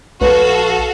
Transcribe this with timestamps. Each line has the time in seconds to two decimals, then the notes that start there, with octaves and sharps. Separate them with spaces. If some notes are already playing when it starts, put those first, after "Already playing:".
0.21 A#1 F#4 A4 B4 F5